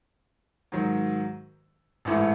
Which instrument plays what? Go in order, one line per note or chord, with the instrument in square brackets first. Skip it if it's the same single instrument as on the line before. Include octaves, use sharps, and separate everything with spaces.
[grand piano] G#2 D#3 F#3
A1 G#2 E3 A3